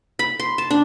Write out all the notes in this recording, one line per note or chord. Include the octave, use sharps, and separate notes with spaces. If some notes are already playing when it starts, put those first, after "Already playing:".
B5
C6
A5
D4